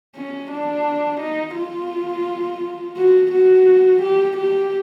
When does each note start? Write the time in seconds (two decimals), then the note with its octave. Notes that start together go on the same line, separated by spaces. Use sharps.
0.16 C#4
0.51 D4
1.21 D#4
1.56 F4
2.97 F#4
3.32 F#4
4.02 G4
4.37 G4